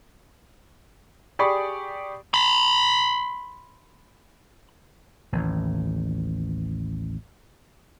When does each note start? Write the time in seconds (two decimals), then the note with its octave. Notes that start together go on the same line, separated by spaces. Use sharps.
1.39 G4 G#4 D5 B5 C#6
2.34 B5 C6
5.33 A1 D#2 A2